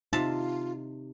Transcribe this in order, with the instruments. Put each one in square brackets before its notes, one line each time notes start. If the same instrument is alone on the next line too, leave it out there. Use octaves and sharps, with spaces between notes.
[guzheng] C3 A5 [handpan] D#4 [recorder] F4